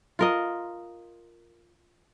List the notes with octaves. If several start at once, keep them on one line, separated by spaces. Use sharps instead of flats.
F4 A#4 D#5